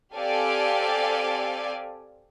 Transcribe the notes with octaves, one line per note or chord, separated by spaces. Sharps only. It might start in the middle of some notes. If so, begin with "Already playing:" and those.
C4 G4 A4 D5 F5 G#5